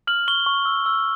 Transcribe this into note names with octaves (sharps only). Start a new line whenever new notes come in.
F6 F#7
C#6 G7
C#6
E6
E6